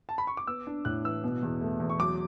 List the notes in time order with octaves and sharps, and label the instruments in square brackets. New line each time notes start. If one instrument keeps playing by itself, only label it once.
[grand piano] A5
B5
C#6
D6
B3 E6
D4
A2 F#6
E3 E6
B2
E2
A3
E2
C#6
F#3 D6